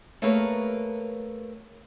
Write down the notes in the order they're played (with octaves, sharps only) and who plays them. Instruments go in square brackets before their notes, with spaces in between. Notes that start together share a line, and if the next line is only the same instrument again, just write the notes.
[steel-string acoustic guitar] A3 A#3 G#4 A#4 B4 C#5